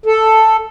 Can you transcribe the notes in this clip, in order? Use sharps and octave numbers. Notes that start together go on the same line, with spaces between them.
A4